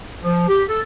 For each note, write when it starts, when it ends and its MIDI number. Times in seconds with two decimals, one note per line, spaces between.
0.22 0.48 53
0.48 0.62 67
0.69 0.80 69